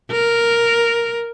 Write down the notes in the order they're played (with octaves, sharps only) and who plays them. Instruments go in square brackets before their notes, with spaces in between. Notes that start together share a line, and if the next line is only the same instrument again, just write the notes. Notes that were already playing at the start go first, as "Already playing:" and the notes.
[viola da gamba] A#4